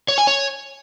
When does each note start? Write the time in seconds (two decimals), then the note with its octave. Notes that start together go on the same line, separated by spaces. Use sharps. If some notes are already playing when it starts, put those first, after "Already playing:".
0.08 C#5
0.18 G#5
0.27 C#5